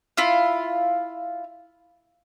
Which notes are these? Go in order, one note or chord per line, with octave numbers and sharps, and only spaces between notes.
E4 F4 F5